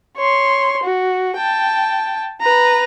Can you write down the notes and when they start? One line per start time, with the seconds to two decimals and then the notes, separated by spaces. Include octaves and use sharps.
0.17 C#5 C6
0.83 F#4
1.37 G5 A5
2.41 B4 A#5